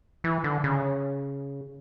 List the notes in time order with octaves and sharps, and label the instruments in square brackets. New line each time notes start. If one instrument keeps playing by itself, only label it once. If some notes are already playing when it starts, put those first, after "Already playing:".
[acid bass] E3
D3
C#3